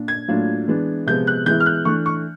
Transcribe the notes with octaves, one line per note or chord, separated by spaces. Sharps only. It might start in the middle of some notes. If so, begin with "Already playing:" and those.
Already playing: A#2 D4
G#6
A2 F#3 A#3 D4 F4
E3 G#3 B3 D4
C3 F3 G#3 B3 G6
F#6
E3 G#3 B3 E4 G6
F6
F#6
E3 A3 D4 C#6
C#6